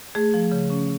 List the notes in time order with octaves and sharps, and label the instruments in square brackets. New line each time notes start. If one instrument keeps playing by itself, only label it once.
[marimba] A3 G#4
F3
C#3
C#4